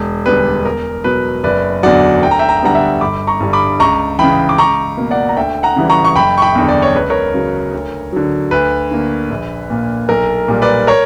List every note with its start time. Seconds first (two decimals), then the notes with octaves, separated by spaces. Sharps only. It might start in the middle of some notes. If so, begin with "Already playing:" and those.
Already playing: E1
0.26 D2 D3 G3 B3 B4
0.65 E2 A#4
1.04 B2 F#3 B4
1.44 F#1 B4 D5
1.83 E2 D3 F#3 D5 F#5
2.22 D2 G5
2.31 A#5
2.39 E5 G5
2.49 A#5
2.57 G5
2.62 D3 G3 B3 F#5 A#5
2.75 E5 G5
3.01 G1 B5 D6
3.27 A#5 C#6
3.40 G2 D3 G3
3.53 B5 D6
3.80 C#2 A#5 C#6
4.19 C#3 E3 G5 B5
4.49 D6
4.58 C#2 A#5 C#6
4.97 B2 A#3
5.11 D5 F#5
5.29 A#5
5.37 D2 E5 G5
5.63 F#5 A#5
5.76 C#3 E3 G3
5.90 A#5 C#6
6.05 C#6
6.16 F#1 G5 B5
6.38 C#6
6.42 G5 B5
6.55 E2 D3
6.68 D5
6.82 C#5
6.94 C#2 B4
7.10 A#4 C#5
7.34 C#3 F#3
7.73 D2
8.13 D3 F#3
8.51 D2 B4
8.91 D3 A#3
9.30 A#1
9.70 A#2 A#3
10.09 B1 A#4
10.48 A#2 G3
10.62 B4 D5
10.87 A#4 C#5